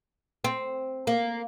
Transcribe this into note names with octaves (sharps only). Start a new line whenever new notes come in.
C4
A#3